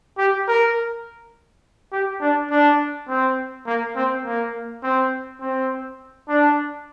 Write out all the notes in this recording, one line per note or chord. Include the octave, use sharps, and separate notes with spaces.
G4
A#4
G4
D4
D4
C4
A#3
C4
A#3
C4
C4
D4